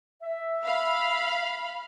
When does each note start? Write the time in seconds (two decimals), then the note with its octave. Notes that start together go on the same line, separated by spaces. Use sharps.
0.22 E5
0.63 F5 B5